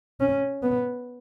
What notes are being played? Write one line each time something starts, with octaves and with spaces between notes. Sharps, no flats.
C#4
B3